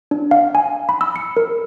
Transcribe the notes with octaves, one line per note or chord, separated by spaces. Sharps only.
D4
F5
G#5
B5
E6
C#7
A#4